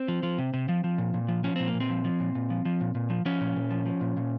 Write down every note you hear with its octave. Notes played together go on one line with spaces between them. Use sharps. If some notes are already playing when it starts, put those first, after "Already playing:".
Already playing: C4
F3
F3
C3
C3
F3
F3
A#2
A#2
F3
F3 C#4
A#2 C4
A#3
A#2
C4
F3
F3
A#2
A#2
F3
F3
A#2
A#2
F3
F3 C#4
A#2
A#2
F3
F3
A#2
A#2